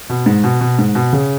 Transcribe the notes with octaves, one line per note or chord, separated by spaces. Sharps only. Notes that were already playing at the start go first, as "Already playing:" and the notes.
B2
G#2
B2
B2
G#2
B2
C#3